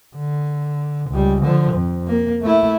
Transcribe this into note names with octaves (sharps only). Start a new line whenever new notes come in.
D3
C#2 G3
D3 F3
F2
A#3
A3 E4